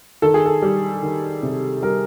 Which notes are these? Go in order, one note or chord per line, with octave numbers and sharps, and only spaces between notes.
D#3 A4
G#4
A4
G3
D#3
C3
G3 A#4